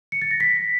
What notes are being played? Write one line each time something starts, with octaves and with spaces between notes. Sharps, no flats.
C#7
A6
A#6
B6